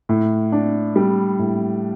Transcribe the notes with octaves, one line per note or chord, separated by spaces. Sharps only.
A2
D4
G3
A2